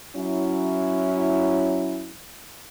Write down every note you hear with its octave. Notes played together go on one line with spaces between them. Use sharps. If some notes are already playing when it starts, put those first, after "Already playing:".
F#3 C#4 E4